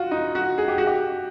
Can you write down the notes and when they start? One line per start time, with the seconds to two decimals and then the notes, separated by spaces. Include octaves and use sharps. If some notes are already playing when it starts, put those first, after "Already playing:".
Already playing: F4 F#4
0.11 D#4
0.35 F#4
0.58 G#4
0.68 G4
0.78 F#4
0.87 G4